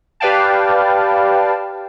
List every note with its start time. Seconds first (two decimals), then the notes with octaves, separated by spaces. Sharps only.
0.20 G4 B4 D5 F5 G5 A5